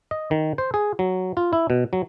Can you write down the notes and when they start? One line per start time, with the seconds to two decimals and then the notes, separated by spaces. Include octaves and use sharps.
0.11 D#5
0.31 D#3
0.58 C5
0.74 G#4
0.99 F#3
1.37 F4
1.53 E4
1.70 B2
1.93 F#3